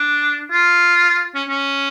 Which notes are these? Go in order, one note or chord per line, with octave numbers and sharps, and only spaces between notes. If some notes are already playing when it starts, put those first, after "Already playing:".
Already playing: D4
F4
C#4
C#4